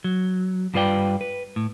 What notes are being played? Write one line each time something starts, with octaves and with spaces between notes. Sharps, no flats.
F#3
G2 G3 F4 B4 D5 G5
B4
A2